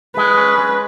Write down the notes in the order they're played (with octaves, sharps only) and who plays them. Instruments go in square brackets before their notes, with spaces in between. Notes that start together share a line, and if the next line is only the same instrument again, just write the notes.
[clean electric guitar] G#3 [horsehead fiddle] B4
[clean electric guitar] C#4
G#3